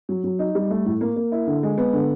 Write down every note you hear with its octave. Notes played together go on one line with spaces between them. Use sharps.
F#3
F#3
D#4
G3
A3
A2
A#3
A#3
E4
D3
G#3
B3
D3